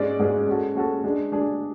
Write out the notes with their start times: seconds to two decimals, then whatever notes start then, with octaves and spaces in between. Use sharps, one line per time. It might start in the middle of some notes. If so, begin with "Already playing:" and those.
Already playing: G#2 G#3 C#4 G#4 D5
0.19 G#2 G#3 C#4 G#4 D5
0.47 G#3 C#4 F#4 A4
0.75 G#3 C#4 F#4 A4
1.04 G#3 D4 G#4
1.32 G#3 D4 G#4